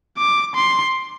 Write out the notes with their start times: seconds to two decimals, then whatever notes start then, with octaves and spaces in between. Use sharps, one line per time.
0.17 D6
0.55 C6